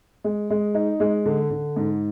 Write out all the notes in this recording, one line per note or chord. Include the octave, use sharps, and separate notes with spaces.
G#3
G#3
D#4
G#3
D3
D3
G#2